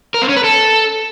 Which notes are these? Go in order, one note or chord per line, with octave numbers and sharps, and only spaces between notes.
A#4
C4
C#4
B4
A4